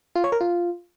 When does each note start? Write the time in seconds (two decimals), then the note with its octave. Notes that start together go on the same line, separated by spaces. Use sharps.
0.15 F4
0.24 C#5
0.32 A#4
0.41 F4